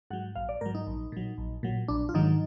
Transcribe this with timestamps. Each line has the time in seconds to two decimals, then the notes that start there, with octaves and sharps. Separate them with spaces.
0.10 G#2 F#3 F#5
0.36 A#1 F5
0.49 D5
0.61 G#2 F#3 A#4
0.75 D#4
0.87 A#1
1.12 A#2 F#3
1.38 A#1
1.63 A#2 F#3
1.88 A#1 D4
2.09 F4
2.14 G#2 D#3 F#3 D#4